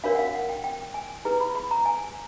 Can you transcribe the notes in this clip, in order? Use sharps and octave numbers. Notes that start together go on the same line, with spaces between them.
D4 F#4 A#4 C#5 F5
F#5
F5
F#5
G5
G5
G#5
E4 G#4 B4 A#5
B5
B5
A#5
G#5